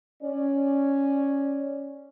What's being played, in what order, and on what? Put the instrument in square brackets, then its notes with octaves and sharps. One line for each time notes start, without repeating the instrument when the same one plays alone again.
[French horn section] C#4 D5